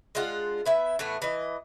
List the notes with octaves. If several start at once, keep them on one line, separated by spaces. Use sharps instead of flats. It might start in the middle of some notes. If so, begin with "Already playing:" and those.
G#3 D4 F4 F#5
B3 E4 E5
A2 E3 A3 B3
E3 D#5